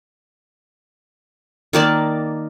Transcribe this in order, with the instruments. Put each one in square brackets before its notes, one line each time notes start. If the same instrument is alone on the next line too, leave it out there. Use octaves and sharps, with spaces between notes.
[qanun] D#3 A#3 D5 A5